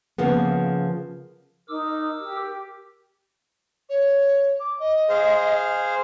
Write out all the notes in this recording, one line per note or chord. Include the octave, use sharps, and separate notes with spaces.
C#3 F3 A#3 B3
D#4 A#4 D6 E6
G4
C#5
D6
D#5
G#4 C5 F5